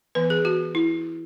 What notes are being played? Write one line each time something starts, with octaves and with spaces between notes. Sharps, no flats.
E3 B3 B4
G#4
F#4
E4